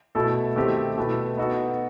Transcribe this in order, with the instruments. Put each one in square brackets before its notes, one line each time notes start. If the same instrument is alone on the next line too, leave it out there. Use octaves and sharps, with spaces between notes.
[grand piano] B2 A3 E4 A4
D#3 A3 C4 E4 G4
B2 A3 E4 B4
B3 D#4 F#4 A4